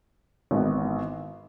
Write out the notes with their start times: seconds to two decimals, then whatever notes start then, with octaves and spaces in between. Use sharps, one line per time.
0.51 G#1 G#2 E3 B3 D#4